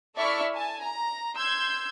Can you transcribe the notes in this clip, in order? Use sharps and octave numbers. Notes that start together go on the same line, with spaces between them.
E4 A4 D5 E5 C#6 F6
G#5 A5
A#5
C6 E6 G6 G#6